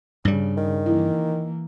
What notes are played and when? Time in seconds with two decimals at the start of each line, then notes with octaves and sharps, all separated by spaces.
0.25 G2 C#3 G3
0.57 D#3
0.86 E3 A#3 E4